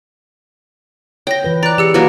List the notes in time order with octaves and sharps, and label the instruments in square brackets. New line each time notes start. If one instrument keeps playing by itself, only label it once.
[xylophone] C#5 A#6 [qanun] G5
[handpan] E3 F4 B4
[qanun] D5 [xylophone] A#5 F#6
[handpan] E3 G#4 [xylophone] G4 E6 C#7
[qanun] F#3 A#3 F#4 [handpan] B4